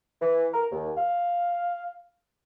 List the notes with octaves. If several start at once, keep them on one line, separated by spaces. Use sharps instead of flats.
E3
A#4
D#2
F5